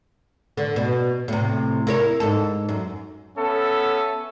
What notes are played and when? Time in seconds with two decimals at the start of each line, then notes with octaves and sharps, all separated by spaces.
0.57 D3
0.76 B2
1.28 A2 C3
1.87 E4 A#4 C#5
2.20 G#2 A4
2.69 F#2
3.37 B3 C#4 A4 E5